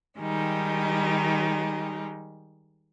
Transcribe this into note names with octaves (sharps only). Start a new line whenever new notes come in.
D#3 G3 G#3 D#4